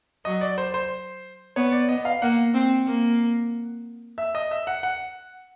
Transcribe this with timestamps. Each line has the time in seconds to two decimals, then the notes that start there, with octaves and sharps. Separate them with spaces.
0.25 F#3 D#5
0.41 D5
0.58 C5
0.74 C5
1.56 B3 C#5
1.72 D5
1.89 B3 D#5
2.05 F5
2.22 A#3 F#5
2.54 C4
2.87 A#3
4.18 E5
4.35 D#5
4.51 E5
4.67 F#5
4.83 F#5